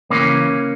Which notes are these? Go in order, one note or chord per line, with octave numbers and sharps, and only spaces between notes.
C#3 E3 A#3 C#4